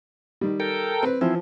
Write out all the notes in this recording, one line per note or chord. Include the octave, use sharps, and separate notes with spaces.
D#3 G3
A4 A#4 G5
C4 B4
E3 F3 C4 E4